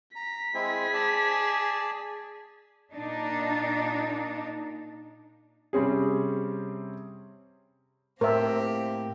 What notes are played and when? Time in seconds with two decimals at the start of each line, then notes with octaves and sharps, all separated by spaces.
0.16 A#5 B6
0.54 G#3 C4 E4 G#4
0.94 D5 A5
2.92 A#2 D4 D#4
5.73 C3 G3 C4 C#4 G#4
8.21 A2 A#3 C4 G4 A#4 C5 E5